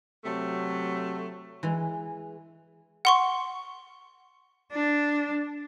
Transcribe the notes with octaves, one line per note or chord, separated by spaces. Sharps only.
C3 F#3 A3
E3 G#3
F#5 C6 C#6
D4